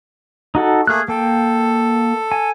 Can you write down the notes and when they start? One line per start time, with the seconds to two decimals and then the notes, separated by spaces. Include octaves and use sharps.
0.55 D#4 F#4 A4
0.87 A3 A#3 G#4 F6 F#6
1.08 A#3 A4 G5
2.32 G#5